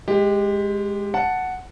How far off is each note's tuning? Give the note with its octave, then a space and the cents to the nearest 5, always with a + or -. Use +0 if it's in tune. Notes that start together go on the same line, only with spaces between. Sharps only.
G#3 +0 G4 +20
F#5 +0 A5 +0